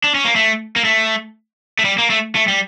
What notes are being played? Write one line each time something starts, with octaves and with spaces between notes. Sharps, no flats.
D4
C#4
A#3
A3
A#3
A3
A3
G3
A#3
A3
A3
G3